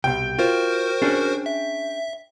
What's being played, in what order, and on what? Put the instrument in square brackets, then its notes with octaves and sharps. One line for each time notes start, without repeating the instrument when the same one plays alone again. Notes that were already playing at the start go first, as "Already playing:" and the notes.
[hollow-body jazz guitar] C2 B2 [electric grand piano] G5
[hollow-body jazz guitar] F4 [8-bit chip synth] F#4 A#4 C5
[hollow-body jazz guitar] C#4 D4 G#4
[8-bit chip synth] E5